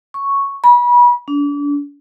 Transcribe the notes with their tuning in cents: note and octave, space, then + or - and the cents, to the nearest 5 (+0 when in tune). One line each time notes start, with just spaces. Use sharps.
C#6 +0
B5 -30
D4 -35